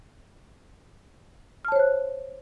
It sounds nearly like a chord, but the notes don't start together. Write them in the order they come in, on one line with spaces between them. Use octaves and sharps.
F6 A5 C#5 C5 F#6